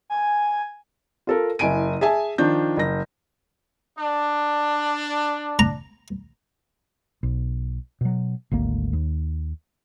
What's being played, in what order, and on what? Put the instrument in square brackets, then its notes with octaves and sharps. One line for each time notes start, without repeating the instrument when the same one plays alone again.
[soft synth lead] G#5
[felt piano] F4 A4 A#4
F#1 E4 G#5 D7 D#7
G#4 E5 G#5 A5
D#3 F3 D4 G6
F#1 A#6
[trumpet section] D4
[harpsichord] A#5
[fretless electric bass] B1
B2 F#3
G#1 D2 A#3
D#2